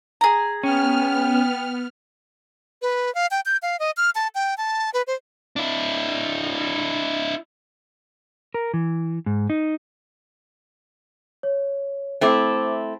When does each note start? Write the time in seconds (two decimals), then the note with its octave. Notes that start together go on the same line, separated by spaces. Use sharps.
0.21 G#4 A#5
0.63 B3 C#4 G5 F6
2.82 B4
3.15 F5
3.31 G5
3.46 G6
3.62 F5
3.80 D#5
3.97 F6
4.15 A5
4.35 G5
4.58 A5
4.94 B4
5.07 C5
5.56 D4 E4
8.54 A#4
8.74 E3
9.26 G#2
9.50 D#4
11.43 C#5
12.21 A3 C4 E4 C5 D6